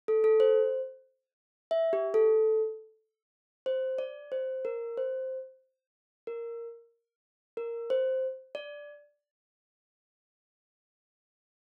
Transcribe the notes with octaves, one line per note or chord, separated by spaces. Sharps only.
A4
A4
C5
E5
G4
A4
C5
D5
C5
A#4
C5
A#4
A#4
C5
D5